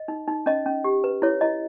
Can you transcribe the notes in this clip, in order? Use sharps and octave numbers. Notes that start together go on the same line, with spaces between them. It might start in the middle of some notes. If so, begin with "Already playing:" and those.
Already playing: D#5
D#4
D#4
C#4 D#5
C#4
G4
B4
E4 C#5
E4 D#5